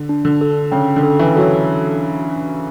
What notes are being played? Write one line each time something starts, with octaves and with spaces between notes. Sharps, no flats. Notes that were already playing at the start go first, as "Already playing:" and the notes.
Already playing: D3
D4
D3
A4
C#3 G5
D3
A4
E3
F#3 A4